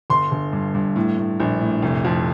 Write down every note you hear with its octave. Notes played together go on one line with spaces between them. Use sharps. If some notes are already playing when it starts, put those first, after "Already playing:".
G1 C6
G1
G2
G2
A2
A2
A#1
A2
F1
F2